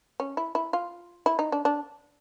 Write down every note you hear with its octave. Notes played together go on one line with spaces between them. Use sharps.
C#4
E4
E4
F4
E4
D#4
D4
D4